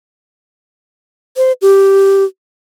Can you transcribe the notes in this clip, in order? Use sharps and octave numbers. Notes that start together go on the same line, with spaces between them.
C5
G4